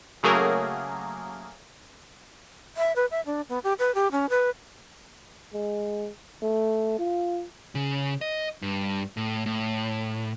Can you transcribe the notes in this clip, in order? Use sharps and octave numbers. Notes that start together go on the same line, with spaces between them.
C#3 F#3 A3 A#3 G#4 A#4
E5
B4
E5
D4
B3
G4
B4
G4
C#4
B4
G#3
A3
F4
C#3
D#5
G2
A2
A2